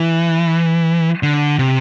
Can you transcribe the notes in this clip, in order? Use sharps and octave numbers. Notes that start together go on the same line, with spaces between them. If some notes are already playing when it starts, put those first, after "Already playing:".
Already playing: E3
D3
C3